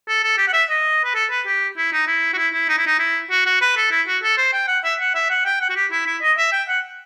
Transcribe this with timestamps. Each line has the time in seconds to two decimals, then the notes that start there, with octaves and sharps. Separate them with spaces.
0.08 A4
0.23 A4
0.38 G4
0.48 F#5
0.53 E5
0.69 D#5
1.05 B4
1.15 A4
1.31 B4
1.46 G4
1.77 E4
1.93 D#4
2.07 E4
2.33 F#4
2.38 E4
2.54 E4
2.69 D#4
2.78 E4
2.87 D#4
2.99 E4
3.31 F#4
3.46 F#4
3.62 B4
3.77 A4
3.91 E4
4.08 F#4
4.23 A4
4.38 C5
4.53 G5
4.68 F#5
4.84 E5
5.00 F#5
5.15 E5
5.30 F#5
5.46 G5
5.61 F#5
5.70 F#4
5.76 G4
5.92 E4
6.07 E4
6.22 D#5
6.38 E5
6.52 G5
6.69 F#5